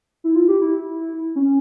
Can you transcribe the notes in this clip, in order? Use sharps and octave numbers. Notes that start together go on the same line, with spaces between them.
E4
F4
G4
E4
C#4